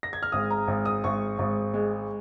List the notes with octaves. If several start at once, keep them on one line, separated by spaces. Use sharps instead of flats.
A#6
G#6
F6
G#1 D#6
A#5
G#1
D#6
G#1 C#6
G#1
G#3